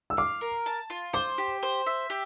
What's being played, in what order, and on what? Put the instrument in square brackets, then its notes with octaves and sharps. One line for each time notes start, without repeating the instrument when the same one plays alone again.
[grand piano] E6
[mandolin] F5 [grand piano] D6
[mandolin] A#4
A5
F4
[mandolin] C5 [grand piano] D6
[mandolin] G4
C5
E5
G4